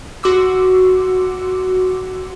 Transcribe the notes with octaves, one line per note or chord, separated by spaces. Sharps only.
F#4 C6 D6 E6